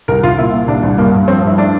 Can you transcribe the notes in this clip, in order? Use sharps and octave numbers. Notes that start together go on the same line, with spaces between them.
C2 A#4
C2 F4
A#2 E4
A#2
C2 D4
C2
G2 A#3
G2
F3 C4
G2 E4
A3 D4